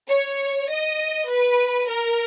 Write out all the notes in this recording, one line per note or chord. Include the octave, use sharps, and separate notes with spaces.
C#5
D#5
B4
A#4